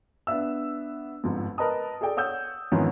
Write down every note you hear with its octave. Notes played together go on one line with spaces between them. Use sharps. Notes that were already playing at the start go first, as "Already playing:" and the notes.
B3 D4 E5 E6
G1 F2 G#2
A#4 B4 D#5 A5 D#6
G#4 A4 D5 G5
C#5 F#5 D#6 E6 G6
F2 G#2 D#3 E3 B3 C#4